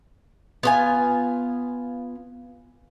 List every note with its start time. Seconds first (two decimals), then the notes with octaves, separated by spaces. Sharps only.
0.63 B3 F4 G#5